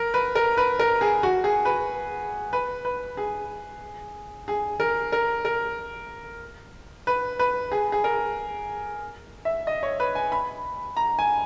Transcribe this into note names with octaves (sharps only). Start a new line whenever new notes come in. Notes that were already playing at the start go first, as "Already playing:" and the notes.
Already playing: A#4
B4
A#4
B4
A#4
G#4
F#4
G#4
B4
B4
B4
G#4
G#4
A#4
A#4
A#4
B4
B4
G#4
G#4
A#4
E5
D#5
C#5
B4
G#5
B5
A#5
G#5